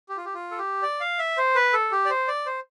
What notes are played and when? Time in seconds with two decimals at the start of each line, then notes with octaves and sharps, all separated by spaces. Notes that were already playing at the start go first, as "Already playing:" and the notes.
0.09 G4
0.17 F4
0.25 G4
0.34 F4
0.51 A4
0.58 G4
0.82 D5
1.00 F5
1.19 E5
1.37 C5
1.55 B4
1.73 A4
1.92 G4
2.05 D5
2.10 C5
2.28 D5
2.46 C5